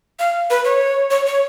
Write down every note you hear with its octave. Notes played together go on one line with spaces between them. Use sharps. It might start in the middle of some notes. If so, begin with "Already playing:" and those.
F5
B4
C#5
C#5
C#5